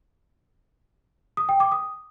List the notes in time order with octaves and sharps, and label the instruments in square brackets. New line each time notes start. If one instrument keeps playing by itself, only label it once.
[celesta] D#6
G5
D6
D#6